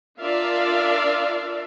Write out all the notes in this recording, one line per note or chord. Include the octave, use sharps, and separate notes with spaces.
D4 F4 A#4 D5 E5 F5